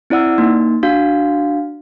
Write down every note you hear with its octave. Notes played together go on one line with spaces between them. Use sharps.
C4 E4 D5 F#5 E6
A#3 D#4
D4 F#4 F5